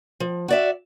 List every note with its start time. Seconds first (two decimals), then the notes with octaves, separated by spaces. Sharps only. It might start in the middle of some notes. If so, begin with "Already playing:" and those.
0.20 F3
0.48 F#4 D5 E5